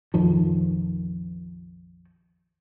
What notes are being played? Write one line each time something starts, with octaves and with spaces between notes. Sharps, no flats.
A#1 F2 D#3 F3